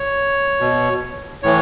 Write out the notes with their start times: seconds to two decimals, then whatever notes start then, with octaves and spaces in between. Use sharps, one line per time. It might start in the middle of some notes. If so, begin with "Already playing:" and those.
Already playing: C#5
0.60 B2
1.43 A2 E3 C#5